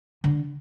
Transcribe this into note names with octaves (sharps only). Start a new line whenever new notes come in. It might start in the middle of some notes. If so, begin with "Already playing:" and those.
D3